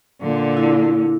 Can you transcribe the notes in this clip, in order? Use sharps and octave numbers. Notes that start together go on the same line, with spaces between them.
A#2 D3
E4